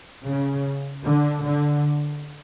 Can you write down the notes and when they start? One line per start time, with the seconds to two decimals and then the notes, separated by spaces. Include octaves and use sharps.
0.26 C#3
1.05 D3
1.43 D3